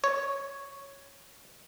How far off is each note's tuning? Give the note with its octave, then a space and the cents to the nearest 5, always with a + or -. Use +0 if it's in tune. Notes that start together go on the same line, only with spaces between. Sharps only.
C#5 +0